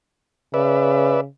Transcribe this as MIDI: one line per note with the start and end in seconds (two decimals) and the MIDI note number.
0.54 1.27 49
0.54 1.21 71
0.54 1.21 74
0.54 1.21 76